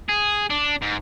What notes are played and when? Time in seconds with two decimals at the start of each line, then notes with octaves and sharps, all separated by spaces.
0.09 G#4
0.50 D4
0.82 G#2